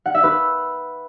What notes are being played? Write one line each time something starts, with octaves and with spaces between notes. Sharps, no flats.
F#5
E5
B4